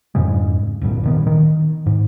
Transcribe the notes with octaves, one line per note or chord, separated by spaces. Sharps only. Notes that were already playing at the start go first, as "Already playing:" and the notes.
F2 G#2 C#3 G#3
D1 G1 G2 A#2
A#2 D#3 B3
D#3
G#2